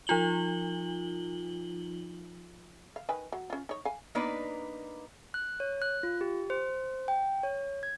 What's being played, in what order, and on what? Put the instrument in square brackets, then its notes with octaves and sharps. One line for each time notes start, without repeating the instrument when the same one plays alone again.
[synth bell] F3 D#4 F4 F#7 G7
[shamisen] F5
D#3 B4 G#5
F#3
C#4 F4
D#4 C#5
F5 G#5
[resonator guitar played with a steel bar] A#3 B3 D4 D#4 B4 D5
[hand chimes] F#6
C#5
F#6
F4
G4
C5
G5
C#5
G#6